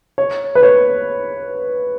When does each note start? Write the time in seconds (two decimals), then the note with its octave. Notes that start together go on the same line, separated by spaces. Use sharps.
0.18 C#5
0.55 B4
0.63 C#5